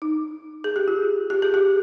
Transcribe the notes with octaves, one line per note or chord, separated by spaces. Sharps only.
D#4
G#4
G4
F4
G4
G#4
G4